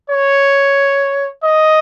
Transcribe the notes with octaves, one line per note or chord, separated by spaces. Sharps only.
C#5
D#5